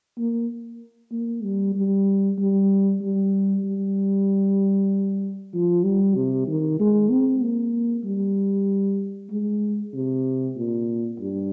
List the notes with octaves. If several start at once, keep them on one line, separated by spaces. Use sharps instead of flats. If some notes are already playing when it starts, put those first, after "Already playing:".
A#3
A#3
G3
G3
G3
G3
G3
F3
G3
C3
D#3
G#3
C4
A#3
G3
G#3
C3
A#2
G2